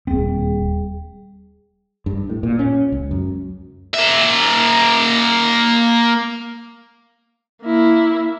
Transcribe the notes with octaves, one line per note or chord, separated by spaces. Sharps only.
D#1 G3 C4 G#4
G2
A2
A#2
C#4
C#2
F#2
A#3 E5
A#3 E4